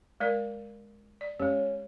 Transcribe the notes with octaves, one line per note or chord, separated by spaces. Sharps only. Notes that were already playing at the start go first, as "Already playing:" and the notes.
G#3 A#4 D5
D5
G#3 C#4 G4